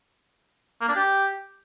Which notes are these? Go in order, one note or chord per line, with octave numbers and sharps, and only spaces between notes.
A#3
D4
G4